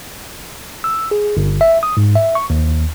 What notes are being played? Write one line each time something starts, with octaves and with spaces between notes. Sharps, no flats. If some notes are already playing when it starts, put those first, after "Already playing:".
E6
G#4
G1
E5
D#6
G#2
E5
C#6
D#2